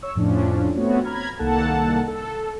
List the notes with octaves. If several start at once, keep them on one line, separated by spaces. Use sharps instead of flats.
C#5 C#6 E6
F2 A2 F3 C#4 D4
A3 B3 C4 F#4 C#5
A#5 B5 F6 G#6
C2 D#3 A#3 A4 F#5 A5
A4